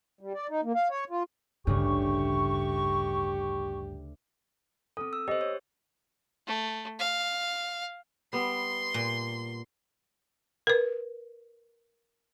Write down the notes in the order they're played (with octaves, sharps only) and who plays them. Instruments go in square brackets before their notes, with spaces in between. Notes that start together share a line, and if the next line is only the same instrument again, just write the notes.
[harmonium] G3
D5
D#4
A#3
F5
C#5
F4
[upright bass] A1 G2 [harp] D2 C#3 [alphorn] G4 [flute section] C#6
[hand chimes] C4 A4 [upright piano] D#6
[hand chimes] E6
[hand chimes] G4 C5 [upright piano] D#5
[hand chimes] C#5
[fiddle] A3
F5
[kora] G3 B3 [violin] C6
[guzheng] A#2
[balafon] A#4 B4